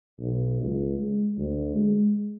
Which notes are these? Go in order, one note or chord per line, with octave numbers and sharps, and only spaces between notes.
B1
C#2
G#3
D2
G#3